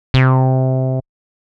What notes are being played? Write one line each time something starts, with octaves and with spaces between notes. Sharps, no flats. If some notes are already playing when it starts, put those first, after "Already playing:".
C3